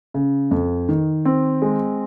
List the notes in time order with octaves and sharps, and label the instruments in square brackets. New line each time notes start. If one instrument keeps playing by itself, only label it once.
[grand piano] C#3
F2
D#3
C4
G#3